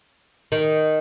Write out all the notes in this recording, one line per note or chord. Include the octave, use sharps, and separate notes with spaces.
D#3